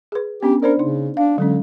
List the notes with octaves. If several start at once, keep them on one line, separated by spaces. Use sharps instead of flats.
G#4 B4
B3 C#4 D4 G4
D4 A#4 C5 D5
C#3 D#4
D4 F5
D3 F#3 G#3 C#4